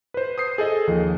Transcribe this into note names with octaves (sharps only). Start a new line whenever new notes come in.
B4 C5
D#6 G6 C7
G#4 A4 D#5
D#2 F3